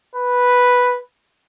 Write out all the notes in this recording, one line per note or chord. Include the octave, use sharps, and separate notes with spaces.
B4